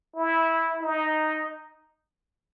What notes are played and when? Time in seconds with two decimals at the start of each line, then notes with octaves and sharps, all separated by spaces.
0.16 E4
0.81 D#4